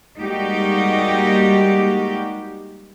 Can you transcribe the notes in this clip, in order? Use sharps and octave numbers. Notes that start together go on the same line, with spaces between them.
G3 G#3 A#3 D#4 F#4 G4